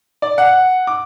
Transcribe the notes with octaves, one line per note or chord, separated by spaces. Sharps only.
D5
F#5
D6